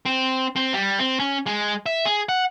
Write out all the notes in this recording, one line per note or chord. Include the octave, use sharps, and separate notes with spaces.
C4
C4
G3
C4
C#4
G#3
E5
G#4
F#5